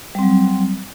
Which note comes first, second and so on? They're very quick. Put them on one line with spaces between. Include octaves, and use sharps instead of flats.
G3 C4 F#3